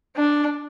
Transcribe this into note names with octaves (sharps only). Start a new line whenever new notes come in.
D4